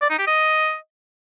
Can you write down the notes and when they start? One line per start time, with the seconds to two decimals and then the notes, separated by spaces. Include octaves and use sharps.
0.02 D5
0.10 D#4
0.19 G4
0.27 D#5